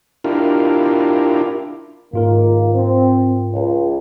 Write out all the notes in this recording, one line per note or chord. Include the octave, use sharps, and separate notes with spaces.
D4 E4 F4 G4 A#4
C#2 G#2 D#3 A#3 F4 A#4
C4
C#2